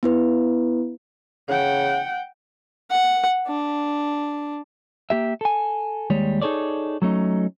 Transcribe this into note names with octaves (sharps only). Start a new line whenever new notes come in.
B3 E4 B4
C#3 F#5 G5
F#5
D4
A#3 G4 E5
A4 G#5
D#2 G3 G#3 C#5
D#4 G#4 A4 C#5 D5
F#3 A3 C#4 D#4